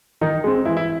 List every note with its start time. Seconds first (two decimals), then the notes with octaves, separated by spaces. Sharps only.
0.21 D#3 D#4
0.44 G#3 C4
0.65 E3 E4
0.77 E4